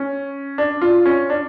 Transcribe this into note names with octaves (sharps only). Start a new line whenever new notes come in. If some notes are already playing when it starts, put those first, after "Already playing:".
Already playing: C#4
D4
F4
C#4
D4